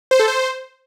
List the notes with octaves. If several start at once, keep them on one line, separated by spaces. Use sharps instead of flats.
C5
A4
C5